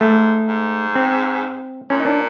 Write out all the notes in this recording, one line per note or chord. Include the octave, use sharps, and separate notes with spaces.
G#2 A3
G#2
C4
A#2 C#4
D#4
D4